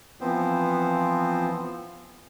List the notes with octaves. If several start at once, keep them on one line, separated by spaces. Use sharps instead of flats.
E3 F3 B3 C4 C5